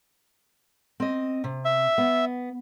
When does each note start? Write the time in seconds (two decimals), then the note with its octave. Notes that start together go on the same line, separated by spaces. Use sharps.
1.00 C4 D#5
1.44 C3
1.65 E5
1.98 B3